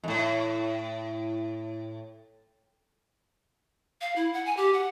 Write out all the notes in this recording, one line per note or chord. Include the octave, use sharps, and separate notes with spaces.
F2 A2
F5
E4
F#5
G#5
G4
F#5